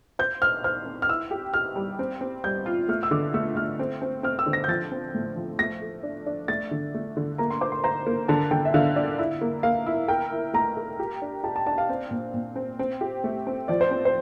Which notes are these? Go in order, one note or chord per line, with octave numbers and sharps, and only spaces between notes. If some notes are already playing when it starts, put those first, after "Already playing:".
C5 G6
C5 F6
C5 F6
C4
F6
E4 E6
G4
G4 F6
G3
C4
C4
G3 G6
F4
A3 F6
E6
D3 D6
A3 E6
A3 F6
C4
C4
C4 F6
E6
D3
A#6
G6
F3 A6
C4
A2
F3
A3 A#6
A4
D4
D4
A3 A6
D3
A3
D3
A#3 A#5
C6
C5 D6
C6
C5 A#5
A#3
D3 A5
D3 G5
E5
D3 F5
D4
E4
A#3
A#3 F5
E4
A#4 G5
E4
A3 A#5
A#4
G4
D4
G4 A5
A5
D4 A5
F5
C4
A#2
A#2
C4
C4
G4
A3
C4
F3 D5
C5
C4
C5